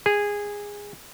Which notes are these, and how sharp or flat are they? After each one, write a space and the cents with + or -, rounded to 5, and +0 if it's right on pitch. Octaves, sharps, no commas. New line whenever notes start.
G#4 -15